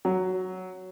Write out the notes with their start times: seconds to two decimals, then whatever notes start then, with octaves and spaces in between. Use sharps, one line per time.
0.05 F#3